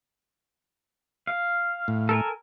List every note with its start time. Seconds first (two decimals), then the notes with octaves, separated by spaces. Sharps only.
1.27 F5
1.88 A2
2.09 A4 A#4 G#5